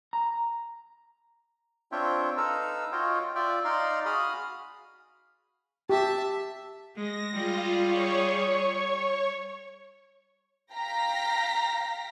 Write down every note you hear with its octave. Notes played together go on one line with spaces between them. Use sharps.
A#5
C4 D4 F4 C#5 E5 G5
D#4 A4 B4 F5 A#5 E6
F4 F#4 C#5 D#5 F5 G5
F4 D5 E5 G5
D#4 D5 F5 A#5 C6
F#4 G#4 F5 B5 D#6 F6
G4 E5 A5
G#3 A#6
G3 F4 G#4
C#5 C#6
F5 G5 A#5 A#6 B6